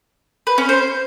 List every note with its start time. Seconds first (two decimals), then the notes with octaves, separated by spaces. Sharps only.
0.47 B4
0.58 C#4
0.69 C5